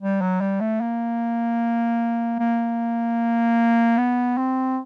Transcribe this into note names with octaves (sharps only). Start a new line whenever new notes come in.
G3
F#3
G3
A3
A#3
A#3
B3
C4